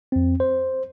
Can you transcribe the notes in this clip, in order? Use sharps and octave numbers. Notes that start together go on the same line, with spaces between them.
F2 C4
C5